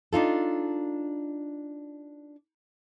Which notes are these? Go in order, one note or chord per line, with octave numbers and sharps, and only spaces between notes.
D4 D#4 F4 A4